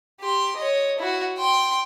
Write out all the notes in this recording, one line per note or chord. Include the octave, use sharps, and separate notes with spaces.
G4 C6
C#5 D#5
E4 F#4
G5 C6